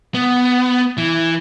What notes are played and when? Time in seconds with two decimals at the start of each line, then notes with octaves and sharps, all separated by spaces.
0.15 B3
0.97 E3